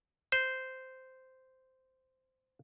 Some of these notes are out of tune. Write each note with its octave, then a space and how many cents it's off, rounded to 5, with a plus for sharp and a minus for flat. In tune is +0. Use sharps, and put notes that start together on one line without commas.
C5 -10